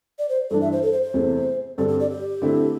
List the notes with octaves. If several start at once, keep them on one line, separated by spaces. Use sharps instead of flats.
D5
C5
G2 E3 G3 D4 A4
E5
C5
A4
C5
C5
E2 C3 A3
G2 D3 C4 G4 A4
G4
D5
G4
D3 A3 C4 E4